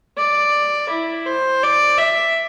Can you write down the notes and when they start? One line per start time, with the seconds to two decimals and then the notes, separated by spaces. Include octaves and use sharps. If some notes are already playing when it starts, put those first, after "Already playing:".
0.18 D5
0.90 E4
1.26 C5
1.63 D5
1.98 E5